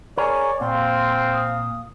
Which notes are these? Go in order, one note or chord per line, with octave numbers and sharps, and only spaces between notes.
G#4 A#4 C#5 D5
A#2 C4 F5 C6
D#6